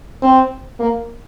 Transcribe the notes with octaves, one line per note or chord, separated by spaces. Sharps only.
C4
A#3